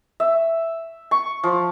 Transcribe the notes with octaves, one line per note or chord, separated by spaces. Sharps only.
E5
C#6
F3